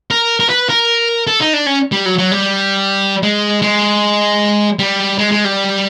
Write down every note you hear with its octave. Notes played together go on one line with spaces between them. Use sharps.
A#4
A#4
B4
A#4
A4
D#4
D4
C#4
G3
F#3
F#3
G3
G#3
G#3
G3
G#3
G#3
G3